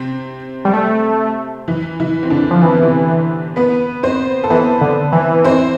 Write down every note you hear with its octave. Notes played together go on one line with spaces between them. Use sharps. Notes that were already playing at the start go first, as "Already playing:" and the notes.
Already playing: C3 C4
G3
A3
E3 E4
E3 E4
C4
D3 D4
F3
E3 C4
B3
C3 C4
B3 B4
C4 C5
A4
E3 B3 B4
D3
E3
C4 C5